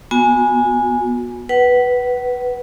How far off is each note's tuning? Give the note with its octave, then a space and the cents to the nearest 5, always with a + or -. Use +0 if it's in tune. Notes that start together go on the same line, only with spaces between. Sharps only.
B3 -20 F#4 -35 G#5 +0
B4 -5 F#5 +30